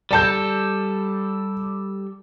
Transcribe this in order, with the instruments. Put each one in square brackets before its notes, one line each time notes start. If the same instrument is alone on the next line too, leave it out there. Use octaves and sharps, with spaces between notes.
[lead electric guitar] G3 A4 [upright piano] D5 A5 G6